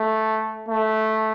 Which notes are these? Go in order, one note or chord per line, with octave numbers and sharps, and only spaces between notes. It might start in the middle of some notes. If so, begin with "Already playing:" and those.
Already playing: A3
A3